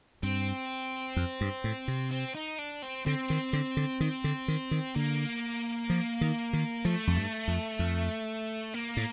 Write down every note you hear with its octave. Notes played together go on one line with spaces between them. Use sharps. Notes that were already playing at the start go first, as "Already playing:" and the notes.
G2 C4
F2
G2
A2
C3
C4
D#4
D4
C4
D3 C4
D#3
D3
D3
D#3
D3
D#3
D#3
D3 A#3
F3
D#3
D#3
F3 A3
F2
G2
F2
F2
A#3
A2